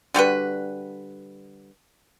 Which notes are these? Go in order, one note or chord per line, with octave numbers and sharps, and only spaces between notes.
D3 G3 F#4 B4